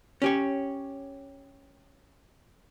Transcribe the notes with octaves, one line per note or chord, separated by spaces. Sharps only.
C#4 G4 C#5